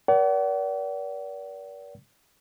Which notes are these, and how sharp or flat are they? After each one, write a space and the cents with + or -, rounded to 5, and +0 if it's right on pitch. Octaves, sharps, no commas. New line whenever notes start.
A#4 +35 D5 -40 F#5 +40